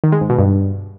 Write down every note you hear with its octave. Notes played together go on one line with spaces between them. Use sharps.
D#3
G#3
G#2
B2
G2